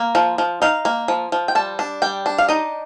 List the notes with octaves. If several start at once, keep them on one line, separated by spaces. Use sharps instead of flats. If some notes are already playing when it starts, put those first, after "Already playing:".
Already playing: A#3
F3
F3
D#4 F5
A#3
F3
F3
G5
G3 A5
D4
G3 G5
D4
F5
D#4 D#5